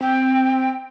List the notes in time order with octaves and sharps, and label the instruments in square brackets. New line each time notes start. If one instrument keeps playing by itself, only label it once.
[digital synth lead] C4 [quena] G5